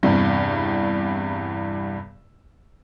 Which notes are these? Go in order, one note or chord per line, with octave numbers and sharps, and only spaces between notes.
E2 G2 C3 G3